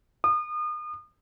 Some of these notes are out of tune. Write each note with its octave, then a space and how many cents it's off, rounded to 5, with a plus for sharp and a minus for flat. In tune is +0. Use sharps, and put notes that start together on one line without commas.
D#6 -35